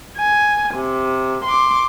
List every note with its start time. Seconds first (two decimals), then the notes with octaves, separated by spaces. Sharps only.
0.18 G#5
0.74 C3
1.45 C6 D6